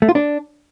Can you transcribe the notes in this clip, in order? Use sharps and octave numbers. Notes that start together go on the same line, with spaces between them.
A3
F4
D4